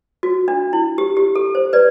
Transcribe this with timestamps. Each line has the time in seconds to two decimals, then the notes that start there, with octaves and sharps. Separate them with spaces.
0.23 F#4
0.48 D4
0.73 E4
0.98 G4
1.17 G4
1.35 A4
1.55 C5
1.73 B4 D5